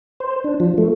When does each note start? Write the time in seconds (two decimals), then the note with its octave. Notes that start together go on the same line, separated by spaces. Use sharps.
0.20 C5
0.44 D4
0.60 F3
0.78 A3